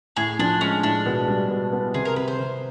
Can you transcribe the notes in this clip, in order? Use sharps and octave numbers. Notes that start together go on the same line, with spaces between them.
A2 G#4
F3 D4
G#3 C#4
A2 D4
B2
G3
B2
B3
C3 G#4
A#4
C3 B4
C5
C3